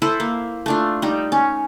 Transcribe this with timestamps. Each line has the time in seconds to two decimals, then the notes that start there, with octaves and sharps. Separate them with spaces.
0.02 E4 A4 B4 C5
0.20 A#3
0.66 A3 D4 F4
1.02 G3 D#4
1.32 C#4